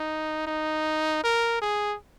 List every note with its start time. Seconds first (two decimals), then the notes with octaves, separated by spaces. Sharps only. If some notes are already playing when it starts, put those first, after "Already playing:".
Already playing: D#4
0.47 D#4
1.24 A#4
1.61 G#4